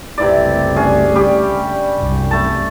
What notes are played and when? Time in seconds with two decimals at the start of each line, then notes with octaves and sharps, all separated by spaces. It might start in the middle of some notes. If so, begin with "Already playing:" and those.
0.18 F#1 C2 C3 E3 A3 D5
0.76 C#4 D4 G#4
1.15 G3 G4
1.95 C2 F#2
2.31 A3 A5